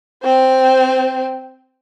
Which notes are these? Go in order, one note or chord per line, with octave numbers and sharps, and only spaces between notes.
C4 C5